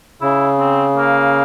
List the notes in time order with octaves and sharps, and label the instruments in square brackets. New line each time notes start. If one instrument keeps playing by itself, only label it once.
[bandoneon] C#3 [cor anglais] E4
[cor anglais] C4
A#3